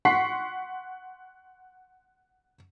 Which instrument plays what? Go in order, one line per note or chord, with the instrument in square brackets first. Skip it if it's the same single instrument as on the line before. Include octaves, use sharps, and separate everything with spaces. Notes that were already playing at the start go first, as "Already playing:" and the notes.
[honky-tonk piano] F#5 C6 C#6 B6 C7